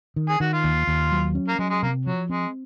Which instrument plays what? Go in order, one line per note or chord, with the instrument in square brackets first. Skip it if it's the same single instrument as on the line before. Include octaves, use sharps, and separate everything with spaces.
[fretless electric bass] D#3
[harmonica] G#4
[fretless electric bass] D#3 [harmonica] F#4
[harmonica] F4
[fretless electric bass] D#2
D#2
F#3
C#4
[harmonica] A#3
[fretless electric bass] F#3 [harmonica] G#3
[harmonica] G#3
[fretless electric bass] C3 [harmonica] A#3
[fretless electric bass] F3 [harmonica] F#3
[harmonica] G#3 [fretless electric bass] C4